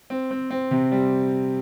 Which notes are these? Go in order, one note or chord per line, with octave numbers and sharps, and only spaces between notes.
C4
C4
C4
C3
G3